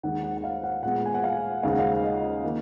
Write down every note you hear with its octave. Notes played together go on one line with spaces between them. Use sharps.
D#2 D#3 G#3 F#5
F#5
F#5
F5
F#5
A#2 G#3 B3 F#5
G#5
F#5
F5
D#2 C#3 G#3 F5
F#5
F5
D#5
D#3 A#3